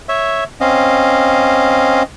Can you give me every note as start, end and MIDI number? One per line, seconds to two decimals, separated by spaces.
0.09 0.44 73
0.09 0.44 76
0.61 2.03 60
0.61 2.03 61
0.61 2.03 75
0.61 2.03 77